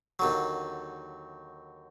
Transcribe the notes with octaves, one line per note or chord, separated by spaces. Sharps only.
D#2 D3 F#3